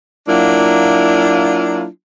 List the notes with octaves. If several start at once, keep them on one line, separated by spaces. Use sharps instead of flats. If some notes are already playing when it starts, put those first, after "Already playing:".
F#3 A#3 D4 E4 F4